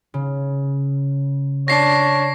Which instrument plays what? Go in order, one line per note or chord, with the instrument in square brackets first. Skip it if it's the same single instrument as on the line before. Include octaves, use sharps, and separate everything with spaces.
[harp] C#3
[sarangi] D4 [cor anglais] C#5 [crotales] A#6 C7